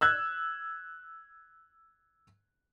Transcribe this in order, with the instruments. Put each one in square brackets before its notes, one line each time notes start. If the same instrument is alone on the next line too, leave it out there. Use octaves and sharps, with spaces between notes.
[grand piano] E6 F#6 G#6